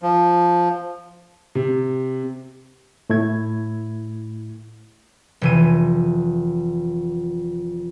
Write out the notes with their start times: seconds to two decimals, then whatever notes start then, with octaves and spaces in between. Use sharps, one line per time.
0.02 F3
1.55 C3
3.10 A2 A3 E4 G#6
5.41 F1 E3 D#7